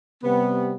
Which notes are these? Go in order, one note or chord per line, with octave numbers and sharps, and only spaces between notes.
C3 G3 B3